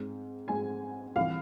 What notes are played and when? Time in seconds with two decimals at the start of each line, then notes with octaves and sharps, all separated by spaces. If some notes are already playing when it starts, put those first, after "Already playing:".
Already playing: G#2 G#3 C4
0.48 G#2 G#3 C4 G#5
1.16 C2 C3 E3 F5